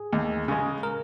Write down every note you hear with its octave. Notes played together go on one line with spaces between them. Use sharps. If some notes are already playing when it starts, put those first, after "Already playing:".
Already playing: G#4
D#2
C#3 G#3
A#4